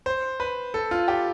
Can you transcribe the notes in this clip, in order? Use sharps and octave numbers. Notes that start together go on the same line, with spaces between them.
C5
B4
A4
F4
G4